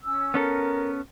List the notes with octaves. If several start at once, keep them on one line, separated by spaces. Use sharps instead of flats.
C#4 E6
B3 C#4 A4 A#4